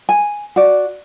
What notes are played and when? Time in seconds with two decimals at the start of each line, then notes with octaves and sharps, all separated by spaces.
0.09 G#5
0.56 F#4 D5